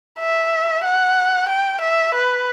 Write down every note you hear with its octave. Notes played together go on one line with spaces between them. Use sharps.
E5
F#5
G5
E5
B4